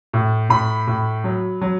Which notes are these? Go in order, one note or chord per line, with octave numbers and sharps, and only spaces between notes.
A2
A2 B5
A2
F#3
F#3